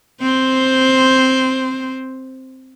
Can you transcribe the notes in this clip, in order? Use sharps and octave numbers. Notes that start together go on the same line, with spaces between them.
C4 C5